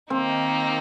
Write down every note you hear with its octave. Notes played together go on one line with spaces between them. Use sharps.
D#3 A#3 C4 D#4